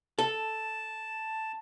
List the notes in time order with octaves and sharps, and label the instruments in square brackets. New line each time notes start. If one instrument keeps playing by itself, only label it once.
[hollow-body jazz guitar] A4 [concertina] A5